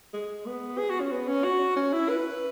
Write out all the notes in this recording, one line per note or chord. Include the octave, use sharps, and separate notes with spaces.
G#3
B3
G#4
F#4
C#4
B3
C#4
F#4
C#4
E4
B4